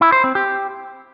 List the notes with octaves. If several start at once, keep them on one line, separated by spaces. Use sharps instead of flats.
E4
C5
C4
G4